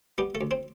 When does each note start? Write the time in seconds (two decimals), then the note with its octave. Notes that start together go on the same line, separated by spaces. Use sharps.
0.18 G3 B3 G4
0.35 A3 A4
0.41 D2
0.51 C4 C5